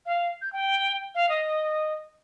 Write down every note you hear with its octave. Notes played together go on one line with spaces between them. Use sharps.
F5
G6
G5
F5
D#5